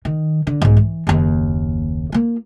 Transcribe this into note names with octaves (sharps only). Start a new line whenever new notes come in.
D#3
D3
B1 G#2
E3
F#1 D#2
A#3 F4